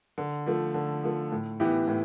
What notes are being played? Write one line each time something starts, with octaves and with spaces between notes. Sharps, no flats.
D3
F3 A3
D3
F3 A3
A2
E3 B3 E4 G4
A2